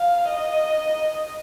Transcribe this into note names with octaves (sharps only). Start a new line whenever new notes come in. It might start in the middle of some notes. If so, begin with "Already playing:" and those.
Already playing: F5
D#5